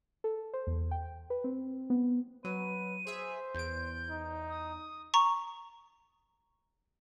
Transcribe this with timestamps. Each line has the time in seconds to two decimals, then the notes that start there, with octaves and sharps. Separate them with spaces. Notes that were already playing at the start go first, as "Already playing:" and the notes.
0.24 A4
0.53 C5
0.67 E2
0.91 G5
1.30 B4
1.44 C4
1.90 B3
2.44 F#3 B4 D#7
3.07 G#4 C5 E5
3.55 E2 G6 D7
4.10 D#4
4.49 D#6
5.14 A#5 C#6